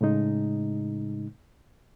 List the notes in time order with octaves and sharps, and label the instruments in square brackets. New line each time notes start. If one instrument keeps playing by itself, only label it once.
[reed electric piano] A2 C#3 G#3 D#4